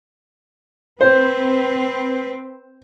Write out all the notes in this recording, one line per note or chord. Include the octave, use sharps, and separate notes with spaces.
C4 B4 C5